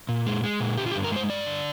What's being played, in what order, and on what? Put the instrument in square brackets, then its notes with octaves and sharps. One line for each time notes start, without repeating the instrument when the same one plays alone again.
[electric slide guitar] A#2
G#3
G#3
A#2
D3 G4
F4
G4
G2
A#4
G#3 C5
G2 D5
D3